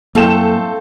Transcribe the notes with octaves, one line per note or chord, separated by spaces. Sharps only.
F#2 A3 A#3 C4 E4 A4 F5 E7